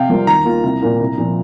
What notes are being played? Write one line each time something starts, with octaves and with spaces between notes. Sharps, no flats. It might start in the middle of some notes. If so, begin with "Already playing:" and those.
Already playing: C3 F5 G5
G3 C4 F4 A#4
D#2 A#5
D#3 A#3 F4
C2
A#2 A#3 F4 A#4
C2
A#2 F3